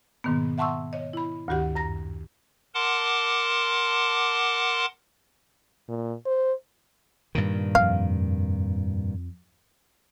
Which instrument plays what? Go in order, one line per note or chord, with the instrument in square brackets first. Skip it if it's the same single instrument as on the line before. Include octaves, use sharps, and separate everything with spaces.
[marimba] G#2 B2 D#3 A#3 B3
E5 F#5 A5 C6 C#6 E6
C#5 D#5
E4 B5
D2 G2 D#3 F#4 G4 F#5
F#2 A#5 A#6
[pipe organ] A#4 F#5 A5 C6 D6
[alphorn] A#2
C5
[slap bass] G2 A#2 D#3
[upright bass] F2 [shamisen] F5